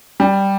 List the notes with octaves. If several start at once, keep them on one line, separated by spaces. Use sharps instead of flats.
G3